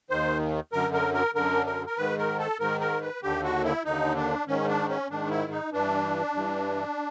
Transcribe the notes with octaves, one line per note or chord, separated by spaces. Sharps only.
D#2 D#3 C5
F#2 D3 A#4
A#4
A#4
F#2 D3 A#4
A#4
A#4
G#2 D#3 B4
A#4
A4
G#2 D#3 A#4
A#4
B4
D#2 D3 G4
F#4
E4
D#2 D3 D#4
D4
G#2 D#3 C#4
D4
C#4
G#2 D#3 D4
E4
D#4
G2 E3 D4
G2 E3